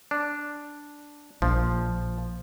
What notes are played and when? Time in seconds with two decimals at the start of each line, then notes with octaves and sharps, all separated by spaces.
0.11 D4
1.42 A#1 F3